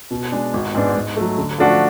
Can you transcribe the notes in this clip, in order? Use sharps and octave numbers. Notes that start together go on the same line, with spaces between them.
B2
G#3 D4
G#1
G#2 G#3 B3 D4
G#2
F#3 A3
D3
F3 A3 D4 F#4